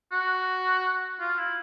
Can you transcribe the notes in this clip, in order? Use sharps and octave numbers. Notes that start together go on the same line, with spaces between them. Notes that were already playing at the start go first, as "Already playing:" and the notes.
F#4
F4
E4